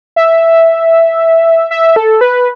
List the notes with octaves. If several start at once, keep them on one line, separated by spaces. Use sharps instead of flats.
E5
E5
A4
B4